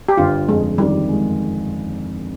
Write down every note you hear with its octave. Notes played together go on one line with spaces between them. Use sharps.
G4
G1 F4
F2 G#3
D#3 G3
G#3